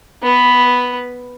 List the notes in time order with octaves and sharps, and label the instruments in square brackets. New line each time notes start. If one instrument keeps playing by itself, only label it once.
[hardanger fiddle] B3 B4